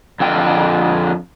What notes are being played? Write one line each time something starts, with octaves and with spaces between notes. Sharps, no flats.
F2 D3 G5